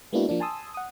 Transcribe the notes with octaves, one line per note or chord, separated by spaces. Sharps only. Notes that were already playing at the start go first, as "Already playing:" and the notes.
G#3 A#3 B3 D4 E4 F#4
F3 A#3 D4
G#5 A5 C6 D#6 E6
F#5 D#6